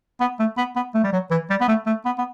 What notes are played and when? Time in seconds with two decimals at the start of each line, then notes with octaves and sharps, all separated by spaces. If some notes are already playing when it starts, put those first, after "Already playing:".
0.21 B3
0.39 A3
0.58 B3
0.76 B3
0.94 A3
1.04 G3
1.13 F#3
1.31 E3
1.50 G3
1.61 B3
1.68 A3
1.86 A3
2.06 B3
2.18 B3